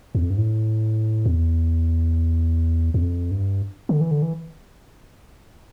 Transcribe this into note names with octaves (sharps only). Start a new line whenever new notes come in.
E2
F2
G2
A2
E2
E2
F2
G2
D3
E3
D3
E3